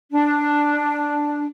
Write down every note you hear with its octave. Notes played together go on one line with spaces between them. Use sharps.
D4